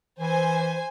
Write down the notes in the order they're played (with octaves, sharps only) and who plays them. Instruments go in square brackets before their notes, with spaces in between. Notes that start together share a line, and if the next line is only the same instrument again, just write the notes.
[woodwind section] E3 [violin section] C5 G#5